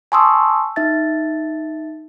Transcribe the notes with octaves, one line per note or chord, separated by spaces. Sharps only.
G#5 A5 C6 C#6 D#6 E6
D#4 E5 A6